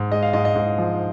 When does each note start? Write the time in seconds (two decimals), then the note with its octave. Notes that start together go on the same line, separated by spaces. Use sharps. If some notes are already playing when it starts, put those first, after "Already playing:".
Already playing: G#2
0.11 G#3 D#5
0.22 F5
0.33 G#2 D#5
0.45 D#5
0.55 G#2
0.78 F3